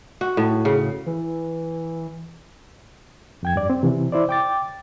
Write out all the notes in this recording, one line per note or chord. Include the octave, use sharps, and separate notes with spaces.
F#4
A2
C#3
E3
F2 G5 G#6
G2 D5
C4
C3 E3
E4 C5 D5
G5 D6 A6